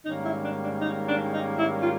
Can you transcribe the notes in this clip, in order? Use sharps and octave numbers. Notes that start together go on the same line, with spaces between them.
G#2 D#3 G3 A#3 C#4 D#4
E4
D4
D4
D#4
D4
D#4
E4
F4